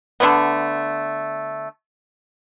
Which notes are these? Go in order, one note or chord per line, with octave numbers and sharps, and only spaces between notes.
D3 A3 B3